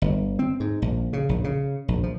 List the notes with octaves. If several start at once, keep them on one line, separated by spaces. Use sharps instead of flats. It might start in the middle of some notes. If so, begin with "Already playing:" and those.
G1
C4
G#2
A#1
C#3
A#1
C#3
A#1
F3